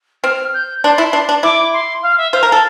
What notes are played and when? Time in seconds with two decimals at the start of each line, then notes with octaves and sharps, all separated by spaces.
0.24 C4 F6
0.54 G6
0.84 D4 C6
0.98 E4
1.13 D4
1.29 D4
1.43 E4 D6
1.73 C6
2.03 F5
2.18 E5
2.33 C5 F5
2.43 A#4
2.48 A4 F5